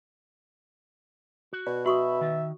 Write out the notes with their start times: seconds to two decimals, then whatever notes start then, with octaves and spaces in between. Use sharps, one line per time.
1.53 F#4
1.67 B2 D5
1.86 F#4 E5 B5 C#6 D#6
2.21 D#3